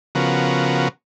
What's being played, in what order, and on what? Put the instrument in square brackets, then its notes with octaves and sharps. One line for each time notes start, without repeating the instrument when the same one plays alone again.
[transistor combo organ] C#3 F3 B3 F#4 A#4